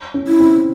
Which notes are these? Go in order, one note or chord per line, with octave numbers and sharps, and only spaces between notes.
C#4
E4
C4